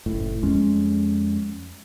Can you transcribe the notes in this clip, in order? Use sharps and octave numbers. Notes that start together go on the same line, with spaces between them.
F#1 A2
F2 G#3 C#4